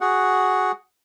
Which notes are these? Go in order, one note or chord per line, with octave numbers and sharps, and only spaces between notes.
F#4 G#4 F#5